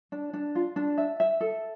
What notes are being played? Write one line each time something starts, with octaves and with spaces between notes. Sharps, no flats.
D4
D4
F4
D4
E5
E5
A4